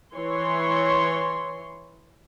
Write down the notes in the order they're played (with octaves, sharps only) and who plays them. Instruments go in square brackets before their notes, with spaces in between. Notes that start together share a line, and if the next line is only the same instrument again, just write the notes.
[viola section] E3 C#5 C6